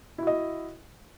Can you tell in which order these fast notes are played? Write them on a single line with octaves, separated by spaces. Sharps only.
E4 F#4 D#5